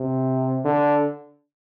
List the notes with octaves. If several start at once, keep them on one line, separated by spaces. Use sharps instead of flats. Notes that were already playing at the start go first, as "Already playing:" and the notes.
Already playing: C3
D3